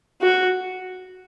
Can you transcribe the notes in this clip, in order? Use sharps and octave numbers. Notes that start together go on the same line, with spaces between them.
F#4